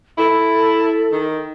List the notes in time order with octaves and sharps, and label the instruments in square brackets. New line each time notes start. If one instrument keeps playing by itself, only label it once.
[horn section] E4 [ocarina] A4
[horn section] D#3